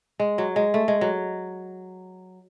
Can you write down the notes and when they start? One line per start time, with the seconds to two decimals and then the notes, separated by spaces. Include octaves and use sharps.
0.20 G#3
0.38 F#3
0.56 G#3
0.74 A3
0.88 G#3
1.01 F#3